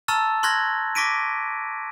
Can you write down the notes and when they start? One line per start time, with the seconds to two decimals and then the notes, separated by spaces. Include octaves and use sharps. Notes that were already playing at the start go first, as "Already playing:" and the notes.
0.08 A5 A#5 C#6 E6 F6 A6
0.43 C6 C#6 F6 F#6 G#6 A#6
0.95 C#6 D6 A#6 B6 D7 D#7